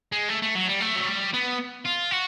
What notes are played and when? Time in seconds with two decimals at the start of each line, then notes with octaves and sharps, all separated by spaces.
0.12 G#3
0.29 A3
0.42 A3
0.55 F#3
0.68 G3
0.81 A3
0.96 F#3
1.06 G3
1.34 B3
1.85 F4
2.11 F#4